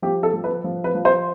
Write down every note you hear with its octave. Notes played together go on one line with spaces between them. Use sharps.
F3 G4
A4
F3
B4
F3
B4
F3
C5